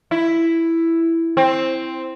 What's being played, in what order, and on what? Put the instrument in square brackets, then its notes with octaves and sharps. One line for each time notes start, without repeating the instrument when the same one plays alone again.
[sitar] E4
C4